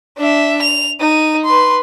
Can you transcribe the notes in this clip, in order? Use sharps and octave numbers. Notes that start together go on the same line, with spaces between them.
D4 E5
F7
D#4 D#7
B4 C6